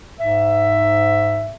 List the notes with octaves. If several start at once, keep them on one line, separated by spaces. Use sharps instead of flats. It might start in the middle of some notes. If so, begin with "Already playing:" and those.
G#2 E5